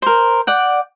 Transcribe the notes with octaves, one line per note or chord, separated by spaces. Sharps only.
A#4 C5
D5 F#5 G5